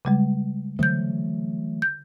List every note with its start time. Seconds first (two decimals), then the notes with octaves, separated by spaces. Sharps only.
0.05 C#3 G3 G#3
0.79 D3 E3 F#3 A3 G6
1.82 G6